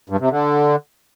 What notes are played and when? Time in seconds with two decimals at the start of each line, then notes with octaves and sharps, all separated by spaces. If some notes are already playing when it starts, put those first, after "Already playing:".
0.10 G2
0.20 C3
0.30 D3